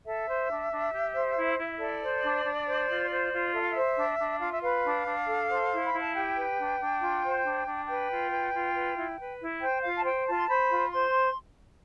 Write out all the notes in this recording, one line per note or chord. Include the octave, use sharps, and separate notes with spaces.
A4 E5
C5
D4
D4
G4
C5
E4
E4
A4 D5
C5
D4
D4
C5
F4
C5
F4
A4 E5
F5
E5
C5
D4
D4
F4 F5
E5
B4 F5
D4
D4
A4
C5
E4
B5
E4
A5
G4 G5
B4
D4
D4
F4
C5
D4
D4
B4 G5
F4
B4
F4
B4
E4
B4
E4
C5 G5
F4 F5
A5
C5 G5
F4 A5
C6
C5 B5
F4
C5 C6